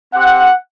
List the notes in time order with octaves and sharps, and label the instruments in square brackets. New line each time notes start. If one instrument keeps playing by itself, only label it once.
[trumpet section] C4 G4 F#5